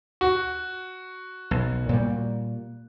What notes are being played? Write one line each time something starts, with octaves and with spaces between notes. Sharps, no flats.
F#4
B1
A#2 G3